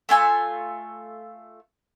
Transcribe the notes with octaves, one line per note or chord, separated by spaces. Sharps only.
A3 F4 G#5 E6